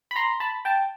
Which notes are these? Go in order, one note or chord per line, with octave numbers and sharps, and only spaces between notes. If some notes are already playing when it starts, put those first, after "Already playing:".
B5
A#5 C6
A5 B5
G5 A5